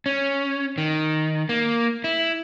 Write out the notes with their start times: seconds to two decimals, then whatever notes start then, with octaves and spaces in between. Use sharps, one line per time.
0.06 C#4
0.78 D#3
1.49 A#3
2.04 E4